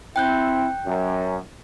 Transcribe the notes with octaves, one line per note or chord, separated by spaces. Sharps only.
C4 E4 G5 F#6 G6
F#2